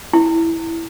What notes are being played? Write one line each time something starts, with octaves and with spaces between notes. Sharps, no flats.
E4